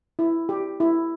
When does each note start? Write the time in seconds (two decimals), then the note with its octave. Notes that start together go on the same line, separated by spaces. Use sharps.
0.19 E4
0.49 G4
0.80 E4